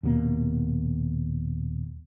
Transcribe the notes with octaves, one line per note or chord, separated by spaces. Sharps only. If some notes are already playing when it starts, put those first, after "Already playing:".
D#1 D#2 B2 A#3